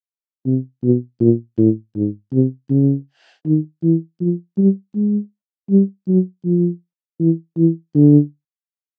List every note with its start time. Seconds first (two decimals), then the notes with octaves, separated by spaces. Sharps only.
0.46 C3
0.83 B2
1.20 A#2
1.58 A2
1.96 G#2
2.33 C3
2.70 C#3
3.46 D#3
3.83 E3
4.21 F3
4.58 G3
4.95 G#3
5.70 G3
6.08 F#3
6.45 F3
7.20 E3
7.57 E3
7.95 D3